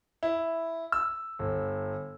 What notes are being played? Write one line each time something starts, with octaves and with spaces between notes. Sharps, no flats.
E4
E6
G1